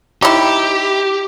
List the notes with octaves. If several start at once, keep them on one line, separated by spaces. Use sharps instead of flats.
D#4 E4 G4 D6